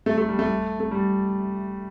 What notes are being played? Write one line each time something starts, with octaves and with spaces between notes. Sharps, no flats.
A3
A3
G3
A3
A3
G3